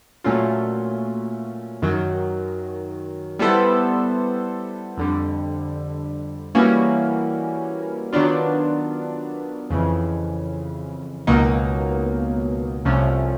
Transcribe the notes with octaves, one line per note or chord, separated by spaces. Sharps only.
A#2 F#3 A3 C#4 F4
F#2 D#3 F#3
G3 B3 E4 A4 C5
F2 D3 G3
E3 G3 A#3 C#4 F#4
D#3 F#3 B3 D4 F4
F2 C#3 E3
C#2 B2 F#3 A#3 D#4
C2 C3 F3 A3 C#4